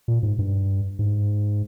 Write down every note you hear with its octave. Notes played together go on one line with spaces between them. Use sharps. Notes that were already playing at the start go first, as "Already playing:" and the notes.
A#2
G#2
G2
G#2